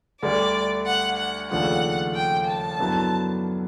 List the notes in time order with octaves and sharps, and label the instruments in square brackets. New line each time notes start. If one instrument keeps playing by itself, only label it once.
[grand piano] D2 D3 G3 [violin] D5
[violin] F#5
F#5
[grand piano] D#2 C#3 F3 A3 D4 [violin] F#5
[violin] G5
A5
[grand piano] F#2 D3 F#3 B3 E4